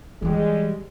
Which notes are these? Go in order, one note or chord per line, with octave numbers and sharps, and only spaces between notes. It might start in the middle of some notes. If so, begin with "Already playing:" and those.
E3 G3 G#3 E4